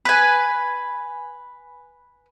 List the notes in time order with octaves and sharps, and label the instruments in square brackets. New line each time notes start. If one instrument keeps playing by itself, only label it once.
[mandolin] B4 G#5